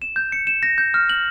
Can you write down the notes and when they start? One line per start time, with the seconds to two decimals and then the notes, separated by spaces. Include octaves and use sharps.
0.02 E7
0.16 G6
0.32 C#7
0.47 E7
0.63 A#6
0.78 G6
0.94 F6
1.09 F#7